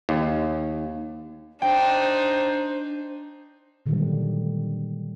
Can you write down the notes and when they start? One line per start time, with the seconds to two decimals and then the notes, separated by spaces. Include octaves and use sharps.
0.09 D#2
1.62 D4 D#4 C5 G5
3.86 A#2 D3 D#3 F#3 G3 A3